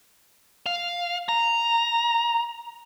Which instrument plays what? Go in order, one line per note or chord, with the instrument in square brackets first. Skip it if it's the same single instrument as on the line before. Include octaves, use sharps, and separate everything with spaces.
[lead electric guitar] F5
A#5